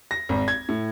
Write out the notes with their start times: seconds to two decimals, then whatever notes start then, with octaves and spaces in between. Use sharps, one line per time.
0.11 A#6
0.29 G#1
0.48 G#6
0.69 A2